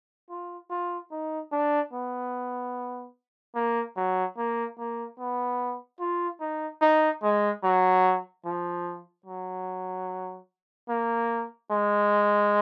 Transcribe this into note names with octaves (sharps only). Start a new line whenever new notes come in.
F4
F4
D#4
D4
B3
A#3
F#3
A#3
A#3
B3
F4
D#4
D#4
G#3
F#3
F3
F#3
A#3
G#3